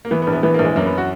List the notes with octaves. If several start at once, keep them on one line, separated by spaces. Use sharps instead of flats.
A#3
E3 B3
B3
A#1
B3
E3 B3
A#3
A#1
G#3
F#2 A#3
B3
F#4